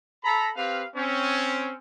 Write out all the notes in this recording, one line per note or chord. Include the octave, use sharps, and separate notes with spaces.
A4 A#5 B5
C4 G4 B4 F5
C4 C#4